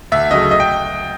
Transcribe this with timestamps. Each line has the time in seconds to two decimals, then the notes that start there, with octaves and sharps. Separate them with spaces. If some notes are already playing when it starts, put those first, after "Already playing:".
0.12 D2 E5
0.31 C#3 F#3 A3 D#5
0.51 D#5
0.60 G5